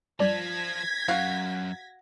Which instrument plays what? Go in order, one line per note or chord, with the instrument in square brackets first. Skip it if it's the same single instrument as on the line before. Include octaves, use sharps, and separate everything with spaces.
[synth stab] G2 D5 A5 [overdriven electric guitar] F3 [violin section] G#6 A#6 B6
[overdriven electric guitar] F#2 [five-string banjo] F#4 F5